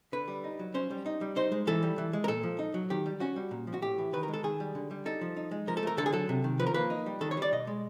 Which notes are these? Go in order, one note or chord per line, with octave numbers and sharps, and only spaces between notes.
D3 B4
G3
D#4
F#3
C#4 C5
G3
D#4
G3
D#4 C5
G#3
E3 A4
G3
E3
G#3
A#4
A#2 A4
F3
D#4
F#3
D#3 G4
G3
C#4 F#4
G3
A#2
F3
F#4
A2 G4
E3
D#3 B4
A#4
G#3
A4
D#3 G#4
G3
D3
G3
D#4 A4
F3
D#4
G#3
F3 A#4
A4
A3 A#4
D3 A4
G#4
F#3 A4
C3
D#3
F3 B4
A#4
A#3 B4
D#4
G3
D#3 A4
C#5
G3 D5
B2 D#5
G#3